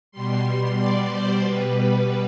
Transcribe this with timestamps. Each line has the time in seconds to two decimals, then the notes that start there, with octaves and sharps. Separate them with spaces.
0.12 B2 G3 C6
0.45 C6
0.78 D5
1.11 C5
1.43 B2 G3 B4